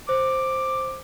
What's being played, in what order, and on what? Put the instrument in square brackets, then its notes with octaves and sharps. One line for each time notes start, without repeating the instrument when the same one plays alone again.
[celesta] C5 [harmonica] D6